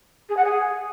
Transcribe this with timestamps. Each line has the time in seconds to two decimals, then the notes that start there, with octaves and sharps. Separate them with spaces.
0.29 G#4
0.37 F#5
0.44 G#4